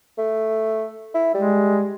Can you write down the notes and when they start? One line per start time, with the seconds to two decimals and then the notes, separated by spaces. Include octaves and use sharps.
0.18 A3
1.15 E4
1.34 G3 G#3